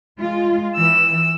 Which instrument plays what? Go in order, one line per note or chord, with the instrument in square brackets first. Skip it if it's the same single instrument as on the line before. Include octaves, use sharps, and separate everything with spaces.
[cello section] G#3 F4
[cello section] E3 [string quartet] E6